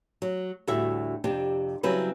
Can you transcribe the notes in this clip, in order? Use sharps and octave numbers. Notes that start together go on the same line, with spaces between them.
F#3
D2 A2 G3 F#4 E5
F2 C3 D4 G4
C#3 F#3 G3 C4 E4 B4